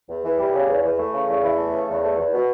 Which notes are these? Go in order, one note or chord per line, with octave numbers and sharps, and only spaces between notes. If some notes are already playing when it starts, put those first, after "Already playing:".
E2
E3
G3
C#3
E2
E3
A3
C#3
E2
E3
A3
C#3
E2
A3
E2
B2